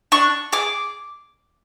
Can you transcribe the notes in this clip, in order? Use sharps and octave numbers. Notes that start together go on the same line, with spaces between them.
D4 C#6
G#4 D6